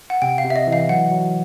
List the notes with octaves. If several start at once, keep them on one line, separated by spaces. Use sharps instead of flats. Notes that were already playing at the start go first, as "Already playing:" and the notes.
F#5
C3 G5
F5
C3
E5
D#5
E3
F5
F#3 F#5
F#3